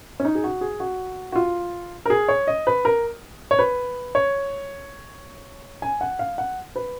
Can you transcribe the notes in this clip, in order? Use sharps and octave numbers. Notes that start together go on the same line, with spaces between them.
C#4
D#4
G#4
F#4
G#4
F#4
F#4
F4
A#4
G#4
C#5
D#5
B4
A#4
C#5
B4
C#5
G#5
F#5
F5
F#5
B4